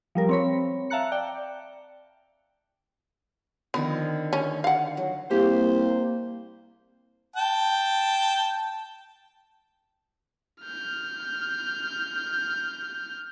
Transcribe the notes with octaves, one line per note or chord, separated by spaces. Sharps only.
F3 G3 A#4
C4 C#5 B5
E5 F5 A5 A#5 F#6 C#7
D5 G5
D3 D#3 F3 B3
C#4
F5 F#5
F#3
C2 A#3 G4 C5
G5 A5
F6 G6